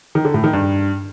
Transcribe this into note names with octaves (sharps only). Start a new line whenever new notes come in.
D#3
D3
A2
D#3
G2